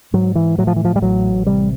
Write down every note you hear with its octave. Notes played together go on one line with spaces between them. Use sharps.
G#2 F#3
E3
A2 F#3
F3
E3
F3
G3
A1 F#3
C3 G3